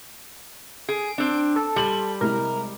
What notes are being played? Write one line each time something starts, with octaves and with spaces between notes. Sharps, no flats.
G#4 D7
C4 D4
A4
G3 C6 F#7
C3 G#3 E4 A#4